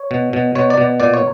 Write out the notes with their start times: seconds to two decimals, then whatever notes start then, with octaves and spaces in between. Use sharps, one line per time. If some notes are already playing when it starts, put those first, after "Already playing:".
Already playing: C#5
0.11 B2
0.33 B2
0.55 B2 C#5
0.70 D5
0.78 B2
1.00 A#2 D5
1.14 C#5